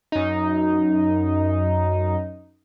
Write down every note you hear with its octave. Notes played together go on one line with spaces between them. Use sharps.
F#2 D#4